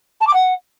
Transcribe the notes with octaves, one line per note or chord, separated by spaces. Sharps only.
A5
D6
F#5